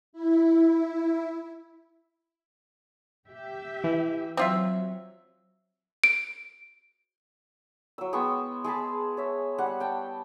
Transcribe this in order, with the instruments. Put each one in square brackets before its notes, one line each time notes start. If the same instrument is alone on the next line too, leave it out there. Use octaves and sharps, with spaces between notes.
[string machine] E4
[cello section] G4 E5
[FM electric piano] E3
[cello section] F#3 [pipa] C4 F4 E5
[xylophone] D7
[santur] F#3 E6
G#3 B3 G5 C#6
G#3 G#4 A5 B5
C#5 E5
G3 F#5
G5 A5